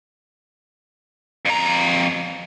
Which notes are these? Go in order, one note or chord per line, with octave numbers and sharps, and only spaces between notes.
F2 A#5